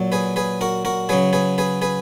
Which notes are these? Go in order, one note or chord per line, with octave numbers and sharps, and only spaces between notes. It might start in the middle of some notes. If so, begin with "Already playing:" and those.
Already playing: A#2 F#3
G#4 B4
G#4 B4
F#4 A#4
F#4 A#4
C#3 F#3 G#4 B4
G#4 B4
G#4 B4
G#4 B4